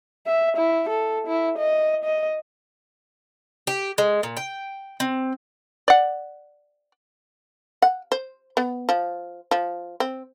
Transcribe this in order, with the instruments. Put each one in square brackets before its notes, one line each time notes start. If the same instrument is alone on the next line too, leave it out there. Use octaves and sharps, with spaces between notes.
[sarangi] E5
E4
A4
E4
D#5
D#5
[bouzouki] G4
G#3
A#2
G5
C4
[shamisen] D5 F#5
F#5
C5
B3
F3
F3
C4